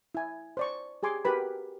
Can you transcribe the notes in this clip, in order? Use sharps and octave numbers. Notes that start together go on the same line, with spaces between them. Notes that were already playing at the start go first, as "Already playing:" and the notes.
E4 G#5
C5 D5 C#6
G4 G#4 G#5 C6 D6
F#4 G4 A#4 B4 B5